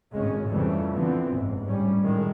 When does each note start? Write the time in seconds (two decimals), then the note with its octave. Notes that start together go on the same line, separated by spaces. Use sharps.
0.12 G#1 A2 C#3 G#3 C#4
0.48 F2 C#3 E3 G3 A3
0.93 D3 E3 F3 B3 C4
1.31 F#1 C#2 G#2
1.66 A1 D2 G3 C#4
2.01 F#2 A2 D#3 G#3